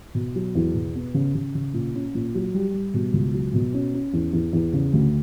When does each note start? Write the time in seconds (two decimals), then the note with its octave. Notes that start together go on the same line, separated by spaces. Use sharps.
0.14 B2
0.35 F#3
0.55 E2
0.74 B2
0.95 B3
1.14 C#3
1.35 C#3
1.55 C#3
1.74 A#2
1.94 C#4
2.15 A#2
2.35 F#3
2.54 G3
2.74 G3
2.94 B2
3.13 C#2
3.34 F#3
3.54 B2
3.74 C#4
3.94 C#4
4.13 E2
4.33 E2
4.53 E2
4.73 C#3
4.93 D2